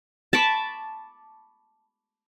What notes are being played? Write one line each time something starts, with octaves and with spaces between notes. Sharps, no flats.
A5 B5 C#6 D6